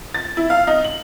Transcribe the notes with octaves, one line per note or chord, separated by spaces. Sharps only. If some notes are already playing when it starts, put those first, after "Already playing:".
A6
E4
F5
D#4
F#7